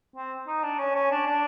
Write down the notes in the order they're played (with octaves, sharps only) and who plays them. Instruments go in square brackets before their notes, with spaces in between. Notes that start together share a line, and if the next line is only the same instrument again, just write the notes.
[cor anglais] C4
D#4
D4
C#4
C#4
D4
D4